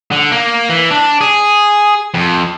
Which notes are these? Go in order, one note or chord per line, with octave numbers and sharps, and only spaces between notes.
D3
A#3
E3
D4
G#4
F2